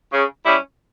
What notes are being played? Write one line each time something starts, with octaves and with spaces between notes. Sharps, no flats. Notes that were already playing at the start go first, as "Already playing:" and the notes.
C#3
G3 C#4 E4